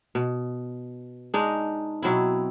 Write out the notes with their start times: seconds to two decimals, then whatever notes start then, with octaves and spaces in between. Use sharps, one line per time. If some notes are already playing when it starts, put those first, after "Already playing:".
0.15 B2
1.34 G#3 D4 D#4
2.02 B2 F#3 C4 E4